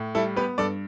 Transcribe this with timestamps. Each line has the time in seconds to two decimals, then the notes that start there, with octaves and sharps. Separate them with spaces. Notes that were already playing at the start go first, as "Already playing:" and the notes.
Already playing: A2
0.15 G3 E4 A4
0.36 B3 G4 B4
0.58 G2 A4 D5